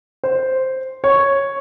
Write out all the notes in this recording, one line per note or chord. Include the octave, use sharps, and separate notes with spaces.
C5
C#5